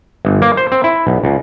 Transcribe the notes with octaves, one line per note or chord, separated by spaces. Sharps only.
G1
A#3
C5
C4
E4
B1
C#2